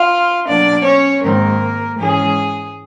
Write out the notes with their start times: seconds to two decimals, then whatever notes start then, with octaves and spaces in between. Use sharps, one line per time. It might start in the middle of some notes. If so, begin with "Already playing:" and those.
Already playing: F4 F5
0.47 B2 F#3 A#3 D4 D5
0.84 C#4 C#5
1.22 G#2 D#3 G#3 A#3 C4 A#4
1.99 G#2 E3 G#3 C#4 G#4